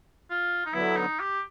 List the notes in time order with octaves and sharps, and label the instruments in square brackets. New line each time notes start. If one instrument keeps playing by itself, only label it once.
[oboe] F4
D#4
[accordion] D3 F#3 B3 [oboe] E4
[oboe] D#4
G4